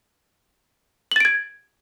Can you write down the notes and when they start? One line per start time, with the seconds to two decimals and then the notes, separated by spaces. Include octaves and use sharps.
1.12 F#7
1.16 A6
1.20 D7
1.25 G#6